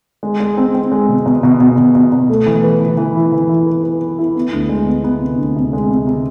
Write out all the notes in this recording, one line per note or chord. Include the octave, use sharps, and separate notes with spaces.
G#3
G#3
C4
C4
G#3
B2
B2
B2
B2
B2
B2
B2
A3
E3
B4
E3
E3
E4
E3
E4
B4
B4
B4
E4
B3
D2
G#3
B3
B3
C3
D2
C3
G#3
C3
C3